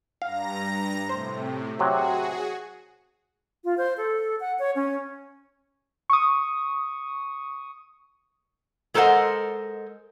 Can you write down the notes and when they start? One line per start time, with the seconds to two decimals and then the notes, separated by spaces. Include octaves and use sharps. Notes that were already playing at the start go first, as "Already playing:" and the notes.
0.22 G2 F5 A#5 A#6
1.09 A2 C3 C5
1.79 C3 F#3 F#4 G#4
3.64 F4
3.77 C5
3.97 A4
4.40 F#5
4.59 C#5
4.75 C#4
6.10 C#6 D#6
8.94 G#3 A4 A#4 C5 D#5 F#5